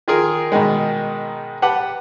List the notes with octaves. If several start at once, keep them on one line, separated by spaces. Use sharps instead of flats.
D#3 F4 G#4 A#4
G#2 B2 D#3 G#3
G4 B4 F#5 A5